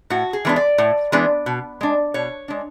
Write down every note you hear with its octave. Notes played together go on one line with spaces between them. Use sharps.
A2 F#4
G#4
E3 G#3 B3 D4
D5
A2
E3 G#3 B3 D4
B2
G#3 D4
B2 C#5
G#3 D4